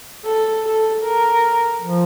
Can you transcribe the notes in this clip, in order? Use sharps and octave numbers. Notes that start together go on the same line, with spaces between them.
A4
A4
A#4
F3